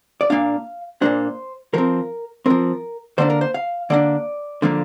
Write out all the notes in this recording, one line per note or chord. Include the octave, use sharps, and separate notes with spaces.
D5
A#2 A#3 D4 F5
A#2 A#3 D4 C5
F3 C4 A#4
F3 C4 A#4
D3 A#3 D4 C5
A#4
C5
F5
D3 A#3 D4 D5
D3 F3 A#3